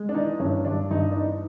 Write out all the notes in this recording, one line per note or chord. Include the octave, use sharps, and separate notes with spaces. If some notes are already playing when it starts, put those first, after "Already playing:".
Already playing: G#3
D4
E3 D#4
G2 C#4
G2 D4
G2 D#4
D4
E3 D#4